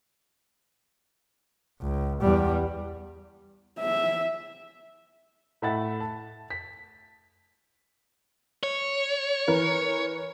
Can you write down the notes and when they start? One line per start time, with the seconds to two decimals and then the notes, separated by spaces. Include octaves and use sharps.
1.81 C#2
2.21 E2 G3
3.79 E5
5.62 A2 A3 E5 F#5 B5 A6
6.00 A5
6.50 B6
8.63 C#5
9.48 E3 A#4 B4